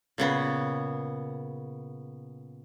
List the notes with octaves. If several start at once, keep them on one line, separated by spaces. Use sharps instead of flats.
A#2 C#3 B3